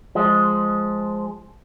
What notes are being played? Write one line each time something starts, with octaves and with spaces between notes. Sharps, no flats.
F3 G#3